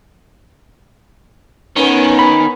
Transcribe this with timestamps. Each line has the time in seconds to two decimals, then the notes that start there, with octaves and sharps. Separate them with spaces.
1.77 D#3 B3 C#4
2.19 B5